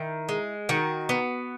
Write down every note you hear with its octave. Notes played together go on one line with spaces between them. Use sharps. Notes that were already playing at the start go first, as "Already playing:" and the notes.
Already playing: D#3 E4
G#3
D#3 F#4
B3